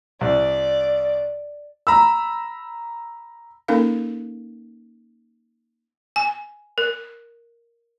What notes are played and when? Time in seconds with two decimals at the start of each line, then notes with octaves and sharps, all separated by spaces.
0.21 C2 D5
1.87 A#5 B5 E6
3.68 A#3 C#4 D#4 A4 A#4 F5
6.16 G#5
6.78 A#4